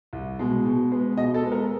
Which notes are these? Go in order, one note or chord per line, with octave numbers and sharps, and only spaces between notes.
C2
B2 G#3
B2
G#3 B3
B2 D#5
A4
G#3 B3
A#4